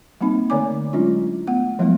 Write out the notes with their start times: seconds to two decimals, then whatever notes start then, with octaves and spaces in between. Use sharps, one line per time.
0.21 G3 A#3 C4 D#4
0.50 D3 A3 C#5 D5 G#5 D6
0.93 F#3 G#3 C#4 D4 E4 F4
1.47 A3 B3 F#5
1.79 F3 F#3 G#3 A3 B3 E4